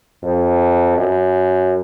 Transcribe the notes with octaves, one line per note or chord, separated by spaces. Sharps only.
F2
F#2